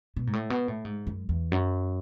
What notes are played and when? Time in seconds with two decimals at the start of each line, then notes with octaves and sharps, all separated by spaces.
0.16 B2
0.27 G#2
0.33 A2
0.50 B2
0.68 A2
0.85 G#2
1.07 F#2
1.29 E2
1.52 F#2